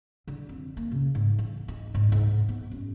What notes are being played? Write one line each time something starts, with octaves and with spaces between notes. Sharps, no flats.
D3
F2
A#3
C#3
G#2
E3
D#4
G#2
G#2
B3
F#2